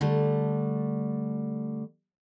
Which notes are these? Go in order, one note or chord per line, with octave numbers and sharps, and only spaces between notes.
D3 G3 A3